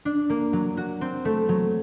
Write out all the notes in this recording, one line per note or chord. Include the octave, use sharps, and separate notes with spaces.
D4
A#3
F#3
F#4
C4
A3
F#3